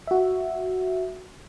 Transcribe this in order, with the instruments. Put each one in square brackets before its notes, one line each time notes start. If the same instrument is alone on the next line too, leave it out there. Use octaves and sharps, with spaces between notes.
[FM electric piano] F#4 E5